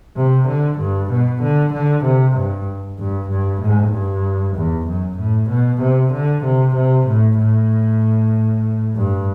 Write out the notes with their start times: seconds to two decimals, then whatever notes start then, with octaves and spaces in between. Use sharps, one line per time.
0.16 C3
0.48 D3
0.79 G2
1.11 B2
1.43 D3
1.74 D3
2.05 C3
2.37 G2
2.99 G2
3.30 G2
3.62 A2
3.93 G2
4.56 E2
4.88 F#2
5.20 A2
5.50 B2
5.82 C3
6.13 D3
6.45 C3
6.76 C3
7.08 A2
7.39 A2
8.96 G2